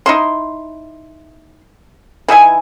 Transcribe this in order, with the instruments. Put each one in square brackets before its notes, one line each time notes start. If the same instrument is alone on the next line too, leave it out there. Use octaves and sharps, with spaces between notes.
[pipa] D#4 E4 C6
E3 D#4 E4 G#5